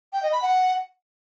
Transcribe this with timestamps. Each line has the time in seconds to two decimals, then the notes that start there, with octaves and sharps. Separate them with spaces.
0.13 G5
0.23 D#5
0.32 B5
0.42 F#5